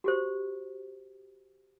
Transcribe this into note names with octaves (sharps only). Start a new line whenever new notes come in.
F#4 G4 C5